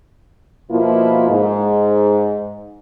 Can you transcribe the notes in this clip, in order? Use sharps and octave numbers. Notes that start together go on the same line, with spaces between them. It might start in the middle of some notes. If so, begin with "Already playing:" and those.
B2 F3 A#3 E4 F4
G#2